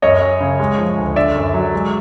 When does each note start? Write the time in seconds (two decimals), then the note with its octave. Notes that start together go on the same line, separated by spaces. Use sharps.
0.02 F#2 C#5 D#5
0.22 F#2
0.41 C#3
0.60 G#3
0.78 F3
0.97 D2
1.16 D3 D5 E5
1.35 F#2
1.54 F#3
1.73 G#3